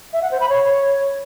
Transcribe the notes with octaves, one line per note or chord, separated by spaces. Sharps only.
E5
F#5
C5
B5
C#5